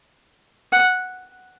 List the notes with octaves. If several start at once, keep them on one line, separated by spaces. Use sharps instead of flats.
F#5